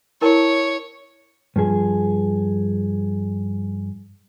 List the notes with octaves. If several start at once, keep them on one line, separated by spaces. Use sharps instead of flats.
E4 A#4 C#5 A5
G2 F3 G#4